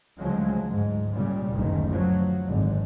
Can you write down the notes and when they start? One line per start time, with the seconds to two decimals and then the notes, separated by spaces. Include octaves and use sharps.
0.19 D2 C#3 F3 F#3 G#3
0.69 G#2
1.13 A#2 C#3 G3
1.53 F#1 D2 D#3
1.87 F3 F#3
2.46 G#1 D3